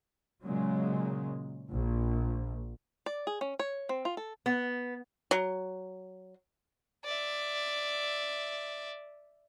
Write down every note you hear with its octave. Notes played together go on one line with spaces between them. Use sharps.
A#2 C#3 F#3 G#3
A#1
D5
G#4
C#4
C#5
C4
F4
A4
B3
F#3
D5 E5